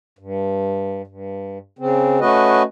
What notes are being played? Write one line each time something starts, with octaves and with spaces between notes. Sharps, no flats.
G2
G2
C#3 C4
A3 C#4 F#4 B4 D#5